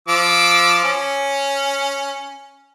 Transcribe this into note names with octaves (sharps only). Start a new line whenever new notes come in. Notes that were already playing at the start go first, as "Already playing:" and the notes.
F3 D6 E6
C#4